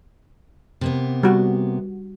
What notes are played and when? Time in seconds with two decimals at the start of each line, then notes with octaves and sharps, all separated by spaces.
0.81 C3 A#3 B3
1.23 G3 F#4